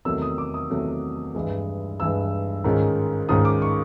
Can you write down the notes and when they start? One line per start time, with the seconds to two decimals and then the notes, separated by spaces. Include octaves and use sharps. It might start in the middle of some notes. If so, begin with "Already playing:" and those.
0.05 E2 C3 D#3 F#3 A3 E6
0.22 D#6
0.38 D6
0.54 D#6
0.70 E2 C3 D#3 F#3 A3
1.35 G2 E3 G#3
2.00 G2 E3 G#3 E6
2.64 G#2 D#3 G#3 C#4 F4
3.28 G#2 D#3 G#3 C#4 F4 D#6
3.45 D6
3.62 C#6